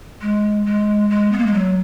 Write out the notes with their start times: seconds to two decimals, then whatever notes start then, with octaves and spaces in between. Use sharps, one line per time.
0.22 G#3
0.66 G#3
1.10 G#3
1.32 B3
1.39 A#3
1.47 G#3
1.54 F#3